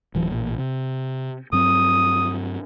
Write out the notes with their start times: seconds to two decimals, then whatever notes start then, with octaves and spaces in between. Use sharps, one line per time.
0.15 D1 E3 F#3
0.31 A1 A#2
0.58 C3
1.53 G2 F#3 C4 D#6